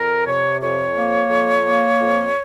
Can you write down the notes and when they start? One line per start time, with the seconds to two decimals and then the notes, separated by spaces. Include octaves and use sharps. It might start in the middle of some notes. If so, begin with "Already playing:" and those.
Already playing: F2 A#4
0.26 C3 C#5
0.61 F2 C#5
0.96 A#3
1.30 F2
1.65 A#3
2.00 F2